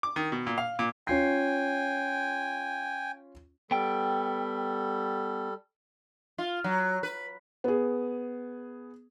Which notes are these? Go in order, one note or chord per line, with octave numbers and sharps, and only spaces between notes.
D6
D#3
B2
A#2
F5
A#2
C#4 F4 G5 G#5 C7
G3 B3 A4 G5
F4
F#3
B4
B3 G#4